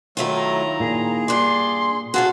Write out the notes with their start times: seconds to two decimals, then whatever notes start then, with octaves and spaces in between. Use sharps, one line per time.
0.17 D#3 F#3 A3 E4 F4
0.35 A#5
0.80 A#2 G#4
1.28 G2 D5 C6
2.14 F4 F#4 G#4 A4 C#5